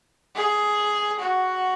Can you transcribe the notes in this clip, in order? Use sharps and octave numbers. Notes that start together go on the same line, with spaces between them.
G#4
F#4